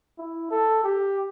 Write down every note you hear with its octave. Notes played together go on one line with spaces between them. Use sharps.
E4
A4
G4